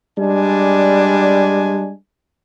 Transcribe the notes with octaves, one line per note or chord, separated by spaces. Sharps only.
G3 G#3 D4 G#5